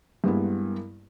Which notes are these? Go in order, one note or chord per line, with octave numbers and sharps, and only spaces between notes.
G2 G#3 A#3 B3 E4